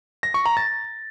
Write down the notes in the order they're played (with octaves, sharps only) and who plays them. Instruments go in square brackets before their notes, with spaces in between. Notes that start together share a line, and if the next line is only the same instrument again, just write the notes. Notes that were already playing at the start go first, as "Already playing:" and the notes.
[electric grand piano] A#6
C#6
A#5
A6